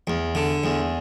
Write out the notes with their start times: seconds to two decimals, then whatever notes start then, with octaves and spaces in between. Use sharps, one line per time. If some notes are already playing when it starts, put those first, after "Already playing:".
0.07 E2
0.35 D3
0.64 E2